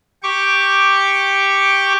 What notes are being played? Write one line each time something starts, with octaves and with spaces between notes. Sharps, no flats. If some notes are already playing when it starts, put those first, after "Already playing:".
G4 C#6 D6